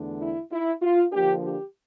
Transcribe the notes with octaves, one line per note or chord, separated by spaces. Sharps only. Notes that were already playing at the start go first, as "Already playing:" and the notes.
Already playing: E2 D3 A3 D4
E4
E4
F4
D3 F3 A#3 D4 G4
G4